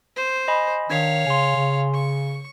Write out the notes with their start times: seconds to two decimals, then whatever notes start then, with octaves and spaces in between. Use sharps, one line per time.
0.16 C5
0.48 D#5 G#5 B5
0.90 D#3 D4 C#5 F5 G#6 B6
1.27 C#3 G#5 C6
1.56 C#3
1.94 C#6